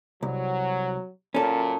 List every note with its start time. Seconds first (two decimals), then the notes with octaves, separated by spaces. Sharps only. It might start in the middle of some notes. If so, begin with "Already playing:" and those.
0.23 C2 F#3
1.35 F#2 A#2 C#4 A4